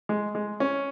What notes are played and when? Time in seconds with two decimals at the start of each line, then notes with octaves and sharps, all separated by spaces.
0.09 G#3
0.35 G#3
0.60 C#4